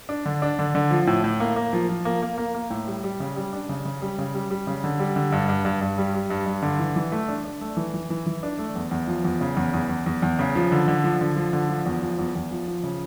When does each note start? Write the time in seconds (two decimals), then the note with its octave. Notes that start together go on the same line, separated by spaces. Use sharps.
0.09 D4
0.26 D3
0.42 D4
0.59 D3
0.75 D3
0.91 F3
1.07 A2
1.24 A2
1.40 A#3
1.56 A#3
1.73 F3
1.89 F3
2.05 A#3
2.22 A#3
2.38 A#3
2.54 A#3
2.70 A2
2.87 G3
3.04 G3
3.20 C#3
3.36 G3
3.53 D4
3.69 C#3
3.85 C#3
4.02 G3
4.18 C#3
4.35 G3
4.51 G3
4.67 C#3
4.84 D3
5.00 G3
5.16 D3
5.32 G2
5.49 G2
5.65 G2
5.81 G2
5.98 G3
6.14 G3
6.30 G2
6.46 G2
6.63 D3
6.79 E3
6.96 E3
7.12 A3
7.28 D4
7.45 D4
7.61 A3
7.77 E3
7.94 E3
8.10 E3
8.26 E3
8.43 D4
8.59 A3
8.75 E2
8.91 E2
9.08 F3
9.24 E2
9.41 C#3
9.57 E2
9.74 E2
9.89 E2
10.06 E2
10.22 E2
10.39 C#3
10.55 F3
10.72 D3
10.88 D3
11.04 F3
11.21 D3
11.36 F3
11.53 D3
11.69 F3
11.86 E2
12.02 F3
12.19 E2
12.35 E2
12.51 F3
12.68 F3
12.83 C#3